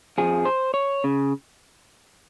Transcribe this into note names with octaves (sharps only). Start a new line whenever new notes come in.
F2 C#3 F3 G#4
C5
C#5
C#3